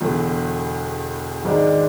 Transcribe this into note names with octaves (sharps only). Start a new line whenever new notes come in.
E1 E2 D3
G#1 G#2 G#3 D4